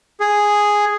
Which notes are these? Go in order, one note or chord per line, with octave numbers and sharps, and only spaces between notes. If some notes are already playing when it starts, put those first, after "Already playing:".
G#4